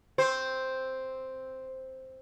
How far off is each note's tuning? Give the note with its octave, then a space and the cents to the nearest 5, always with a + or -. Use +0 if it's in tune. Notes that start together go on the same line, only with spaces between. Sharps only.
C4 +0 C5 +0